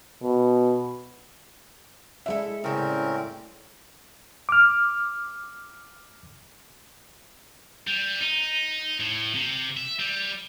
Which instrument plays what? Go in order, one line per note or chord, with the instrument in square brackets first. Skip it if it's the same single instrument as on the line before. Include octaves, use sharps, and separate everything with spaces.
[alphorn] B2
[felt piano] G#3 E5 [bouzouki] D4 E4 A4
[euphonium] A2 [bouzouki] C#3 G3 [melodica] C4 C#4 A#4
[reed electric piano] D6 F6
[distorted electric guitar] G3
D#4
A2
C3
E5
G3